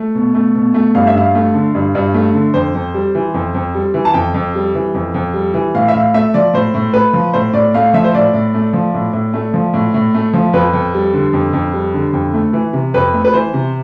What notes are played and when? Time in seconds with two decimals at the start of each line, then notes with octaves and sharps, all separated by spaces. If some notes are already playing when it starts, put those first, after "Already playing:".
Already playing: A3
0.15 B2
0.34 A3
0.55 B2
0.74 A3
0.95 G2 F5
1.07 E5
1.14 G2 F5
1.35 A3
1.54 D3
1.75 G2
1.95 G2
2.14 A3
2.34 D3
2.54 F2 C5
2.74 F2
2.94 G3
3.15 E3
3.34 F2
3.54 F2
3.75 G3
3.94 E3
4.05 A5
4.14 F2 G5
4.34 F2
4.55 G3
4.75 E3
4.94 F2
5.14 F2
5.34 G3
5.54 E3
5.75 A2 F5
5.88 E5
5.94 A2 F5
6.14 A3 E5
6.34 F3 D5
6.54 A2 C5
6.74 A2
6.93 A3 B4
7.13 F3
7.33 A2 C5
7.53 A2 D5
7.74 A3 F5
7.94 F3 E5
8.04 C5
8.14 A2 D5
8.34 A2
8.54 A3
8.73 F3
8.94 A2
9.13 A2
9.34 A3
9.54 F3
9.74 A2
9.94 A2
10.14 A3
10.33 F3
10.53 F2 B4
10.73 F2
10.94 G3
11.14 D3
11.33 F2
11.53 F2
11.73 G3
11.94 D3
12.13 F2
12.34 A3
12.53 E3
12.73 C3
12.94 F2 B4
13.14 A3
13.25 B4
13.34 E3 C5
13.53 C3